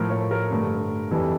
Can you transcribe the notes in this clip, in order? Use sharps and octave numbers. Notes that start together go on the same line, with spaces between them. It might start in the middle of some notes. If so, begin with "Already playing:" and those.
Already playing: A2 F3 A3 A#4
C#5
A#4
G2 D3 A3
F2 E3 G3 A4